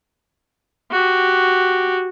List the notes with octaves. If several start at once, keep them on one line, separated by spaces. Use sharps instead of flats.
F#4 G4